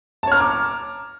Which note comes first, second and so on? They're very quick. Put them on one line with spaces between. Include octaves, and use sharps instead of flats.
A5 C#5 F6 A#5 D6